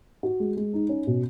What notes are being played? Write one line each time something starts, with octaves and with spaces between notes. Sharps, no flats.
F#4
G#3
G#3
D#4
C#4
B2